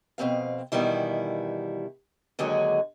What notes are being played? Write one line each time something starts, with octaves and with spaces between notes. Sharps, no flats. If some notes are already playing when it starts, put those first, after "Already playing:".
F2 B2 D#3 C4 F5
B2 D#3 E3 G3 E4
D#2 D3 F#3 G#3 F#4 G#4